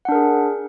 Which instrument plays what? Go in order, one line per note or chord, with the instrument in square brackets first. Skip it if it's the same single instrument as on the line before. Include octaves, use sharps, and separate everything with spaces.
[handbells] F#5
D4
A#4
G#4